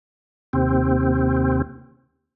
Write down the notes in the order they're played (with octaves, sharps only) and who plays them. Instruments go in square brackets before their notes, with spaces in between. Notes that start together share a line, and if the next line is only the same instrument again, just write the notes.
[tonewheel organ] D#2 C3 C4